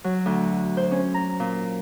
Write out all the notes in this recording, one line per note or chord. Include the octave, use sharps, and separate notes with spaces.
F#3
D2
C5
C#4
A#5
A#2